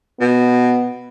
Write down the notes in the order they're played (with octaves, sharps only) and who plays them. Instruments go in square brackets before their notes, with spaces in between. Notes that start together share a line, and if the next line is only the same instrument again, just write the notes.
[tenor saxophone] B2 [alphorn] B3